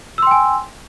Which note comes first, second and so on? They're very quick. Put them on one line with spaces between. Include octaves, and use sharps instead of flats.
E6 C6 G5 G#5